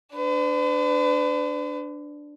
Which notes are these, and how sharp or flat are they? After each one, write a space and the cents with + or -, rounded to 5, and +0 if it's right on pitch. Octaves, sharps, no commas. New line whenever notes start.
D4 +0 B4 +45